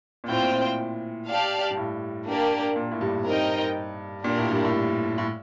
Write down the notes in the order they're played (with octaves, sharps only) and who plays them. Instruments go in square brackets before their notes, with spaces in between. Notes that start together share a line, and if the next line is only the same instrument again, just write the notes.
[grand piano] A#2
[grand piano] A2 [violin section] C4 F4 C5 G5
[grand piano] A#2
A2
[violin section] G4 D5 F5 A5
[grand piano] G2
A2
[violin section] A#3 D4 G4 A#4 D5
[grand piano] A#2
A2
G2
[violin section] C4 D#4 A#4 D#5 G5
[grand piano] A#2 [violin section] D4 G4 A#4
[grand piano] A2
G2
A2
A2